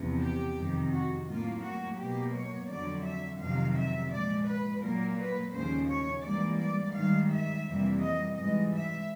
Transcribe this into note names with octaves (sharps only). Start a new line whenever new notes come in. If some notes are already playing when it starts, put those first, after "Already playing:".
Already playing: E2 C3 F3
G4
F2 C3 D#3
F#4
A2 F#3 A#3 F4
F#4
B2 F#3 A#3 G4
C#5
F2 D3 F#3 D5
E5
F2 C3 D#3 F#3 F5
E5
A#2 F3 G#3 D5
B4
A#2 F#3 A#3 A#4
B4
D#2 C#3 F3 C5
C#5
G#2 E3 G3 A#3 D5
D5
G#2 D#3 G3 F5
E5
F2 C3 E3 G3 A#3
D#5
G#2 E3 G3 D#5
E5